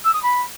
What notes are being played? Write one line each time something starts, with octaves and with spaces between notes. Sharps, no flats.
E6
D#6
B5